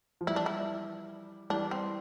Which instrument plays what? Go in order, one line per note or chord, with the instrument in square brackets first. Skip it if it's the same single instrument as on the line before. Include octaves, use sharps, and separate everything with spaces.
[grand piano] F3
[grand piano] E3 G3 [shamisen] E4
[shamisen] D4
E4
[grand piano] E3 G3 [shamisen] D4
[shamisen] C4